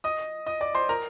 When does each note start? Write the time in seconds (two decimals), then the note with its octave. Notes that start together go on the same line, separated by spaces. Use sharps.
0.04 D#5 D#6
0.46 D#5 D#6
0.61 D5 D6
0.75 C5 C6
0.89 A#4 A#5